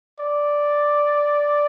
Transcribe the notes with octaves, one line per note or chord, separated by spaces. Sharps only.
D5